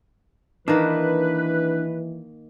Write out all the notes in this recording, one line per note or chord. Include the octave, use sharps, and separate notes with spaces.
D#3 E3 A#3 D4 B4 A5